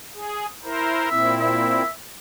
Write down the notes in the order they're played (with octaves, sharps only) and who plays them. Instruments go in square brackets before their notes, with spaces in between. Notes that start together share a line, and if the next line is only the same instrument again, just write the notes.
[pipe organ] G#4
E4 A#4 C5
[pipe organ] A#2 C4 E4 [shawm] E5
[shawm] E5